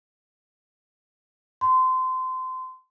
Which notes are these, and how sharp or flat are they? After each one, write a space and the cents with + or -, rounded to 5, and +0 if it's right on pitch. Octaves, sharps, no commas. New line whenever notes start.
C6 -25